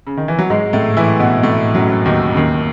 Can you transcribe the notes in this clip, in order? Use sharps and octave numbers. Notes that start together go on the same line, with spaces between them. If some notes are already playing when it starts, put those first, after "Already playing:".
C#3
D#3
E3
F#3
G#2 G#3
A2 A3
E3 E4
B2 B3
A2 A3
F#2 F#3
D#2 D#3
C#3
D#2 D#3